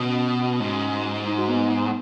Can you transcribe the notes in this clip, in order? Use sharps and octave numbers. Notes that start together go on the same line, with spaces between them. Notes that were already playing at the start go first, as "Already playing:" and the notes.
Already playing: B2 C#4 F#4
G#2
D#4
F#4
B3 D#4